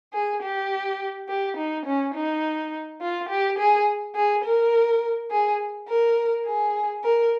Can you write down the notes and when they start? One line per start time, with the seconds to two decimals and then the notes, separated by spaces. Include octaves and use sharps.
0.13 G#4
0.42 G4
1.29 G4
1.57 D#4
1.86 C#4
2.14 D#4
3.01 F4
3.29 G4
3.59 G#4
4.15 G#4
4.45 A#4
5.31 G#4
5.89 A#4
6.46 G#4
7.03 A#4